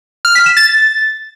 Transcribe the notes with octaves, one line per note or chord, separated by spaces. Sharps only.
F6
B6
E7
A6